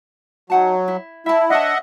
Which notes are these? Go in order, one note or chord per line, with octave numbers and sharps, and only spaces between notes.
F#3 D#4 F#5 A5
E4
E4 E5 A5
D4 C#5 D#5 E5 F#5 A5